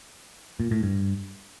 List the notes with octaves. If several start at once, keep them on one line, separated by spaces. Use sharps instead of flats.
A#2
A2
G2